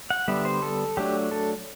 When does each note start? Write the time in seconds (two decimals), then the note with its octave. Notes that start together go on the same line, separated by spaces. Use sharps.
0.10 F#5
0.28 D3 G3 B3 D4 E5
0.45 C5
0.62 A4
0.97 F#3 A3 D4 G4
1.32 A4